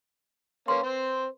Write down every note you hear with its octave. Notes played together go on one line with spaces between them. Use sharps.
A#3 C#4 B4 C6
C4 C5